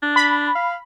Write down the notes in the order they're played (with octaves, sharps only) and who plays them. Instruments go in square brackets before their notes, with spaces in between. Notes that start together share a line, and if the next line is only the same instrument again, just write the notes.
[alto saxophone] D4
[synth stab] B5
[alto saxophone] F5